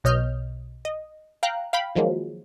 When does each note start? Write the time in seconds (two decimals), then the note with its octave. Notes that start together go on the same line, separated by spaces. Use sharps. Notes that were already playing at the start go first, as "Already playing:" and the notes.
0.04 B1 B2 C#5 D#5 F6 G6
0.85 D#5
1.43 F5 G5 A#5 F#6
1.73 F5 G5 B5
1.95 D#3 F3 F#3 G#3 A#3